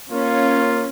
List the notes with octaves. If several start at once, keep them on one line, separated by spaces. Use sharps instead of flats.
A#3 C#4 F4